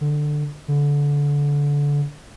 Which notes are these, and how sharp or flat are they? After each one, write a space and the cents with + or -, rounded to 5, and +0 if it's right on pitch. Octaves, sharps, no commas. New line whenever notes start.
D3 +15
D3 -25